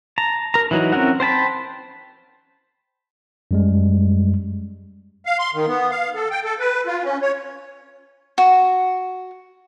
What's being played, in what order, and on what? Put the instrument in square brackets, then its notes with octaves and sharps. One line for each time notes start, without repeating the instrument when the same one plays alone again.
[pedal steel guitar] A5 A#5
A#4 A#5
E3 F#3 D#4
C4 C#4 E4 A#4 F#5
C5 G5 A5 B5
[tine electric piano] F#2 G3 G#3
[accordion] F5
C6
D#3
B3
F5
A4
G5
A4
B4
F4
C#4
C#5
[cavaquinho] F#4